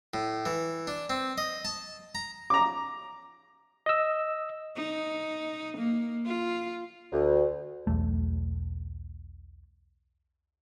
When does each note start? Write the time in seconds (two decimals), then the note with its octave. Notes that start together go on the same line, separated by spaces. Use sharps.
0.14 A2
0.46 E3
0.87 D4
1.10 C4
1.38 D#5
1.65 A5
2.15 A#5
2.50 A#5 D6
3.86 D#5 E6
4.77 D#4
5.78 A#3
6.26 F4
7.13 D2
7.87 E1 B1 E2 A3